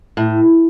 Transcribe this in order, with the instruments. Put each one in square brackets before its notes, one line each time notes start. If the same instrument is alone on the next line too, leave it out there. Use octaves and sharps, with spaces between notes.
[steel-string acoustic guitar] A2